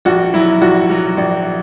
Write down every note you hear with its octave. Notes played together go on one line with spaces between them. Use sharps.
A#1 F#4
F#3 E4
A#1 F#4
F#3
A#1